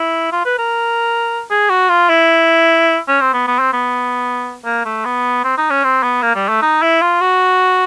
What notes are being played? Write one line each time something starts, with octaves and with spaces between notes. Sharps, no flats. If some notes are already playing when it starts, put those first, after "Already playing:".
Already playing: E4
F4
B4
A#4
G#4
F#4
F4
E4
C#4
C4
B3
B3
C4
B3
A#3
A3
B3
C4
D#4
C#4
C4
B3
A#3
G3
A3
D#4
E4
F4
F#4